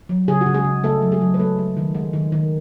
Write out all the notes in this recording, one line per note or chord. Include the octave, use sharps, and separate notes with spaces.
F#3
C#3 G#4
F#4
C#3
G#3 G#4
C#3
C#3 A3 A4
F#3
G#3 G#4
F#3
B4
G#3 A3 A4
G#3
D#3
G#3
D#3
D#3